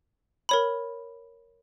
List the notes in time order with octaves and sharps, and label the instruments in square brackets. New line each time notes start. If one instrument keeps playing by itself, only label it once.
[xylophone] A#4 C#5 B5